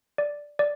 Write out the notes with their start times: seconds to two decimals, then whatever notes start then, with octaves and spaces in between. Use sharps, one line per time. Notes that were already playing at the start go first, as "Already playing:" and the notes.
0.18 D5
0.59 D5